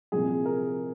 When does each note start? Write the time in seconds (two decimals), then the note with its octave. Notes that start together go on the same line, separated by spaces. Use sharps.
0.12 C2 A#2 F3 G#4
0.45 A#4